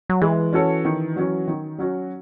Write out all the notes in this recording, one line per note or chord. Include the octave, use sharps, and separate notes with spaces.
F#3
E3 G#3
C#4 F#4 A4 C#5
D#3
F#3 C#4 F#4
D#3
F#3 C#4 F#4